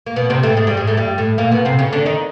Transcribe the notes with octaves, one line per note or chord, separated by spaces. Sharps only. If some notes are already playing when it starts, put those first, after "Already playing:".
A#3
B2 B3
C3 C4
A2 A3
G#2 G#3
G2 G3
G#2 G#3
A2 A3
G2 G3
A2 A3
A#2 A#3
B2 B3
C3 C4
C#3 C#4
D3 D4
D#3 D#4